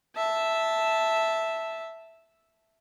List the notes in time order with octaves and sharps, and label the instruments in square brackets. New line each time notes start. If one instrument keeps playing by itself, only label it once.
[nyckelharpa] E5 A5